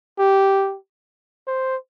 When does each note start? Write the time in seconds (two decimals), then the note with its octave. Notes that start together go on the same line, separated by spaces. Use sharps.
0.19 G4
1.47 C5